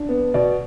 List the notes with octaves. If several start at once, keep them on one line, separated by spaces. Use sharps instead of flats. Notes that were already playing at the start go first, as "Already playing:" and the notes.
Already playing: D4
B3
B2 D5